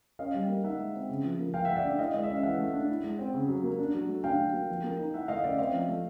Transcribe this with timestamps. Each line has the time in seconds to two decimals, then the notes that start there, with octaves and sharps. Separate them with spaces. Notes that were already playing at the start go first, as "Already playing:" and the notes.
0.19 C#4 D#5 F5
0.34 G3
0.49 A#3
0.64 D#4 E5 F#5
0.79 G#3
0.94 C4
1.09 C#3
1.24 F3
1.39 A#3
1.54 F3 F5 G5
1.65 E5 F#5
1.69 A3
1.76 D5 E5
1.84 D4
1.98 E4 D#5 F5
2.14 G#3 D#5
2.23 E5
2.30 C#4 F5
2.43 E3 E5 F#5
2.59 A3
2.73 D4
2.89 E4
3.04 G#3
3.19 C4
3.34 C#3
3.49 F#3
3.64 A#3
3.79 D4
3.94 F#3
4.09 A3
4.24 D4 F5 G5
4.39 F#3
4.54 A#3
4.69 F3
4.83 A#3
4.99 D#4
5.14 E4 E5 F#5
5.28 A3 D#5 F5
5.44 C#4 D5 E5
5.58 C4 D#5 F5
5.73 F3
5.88 A3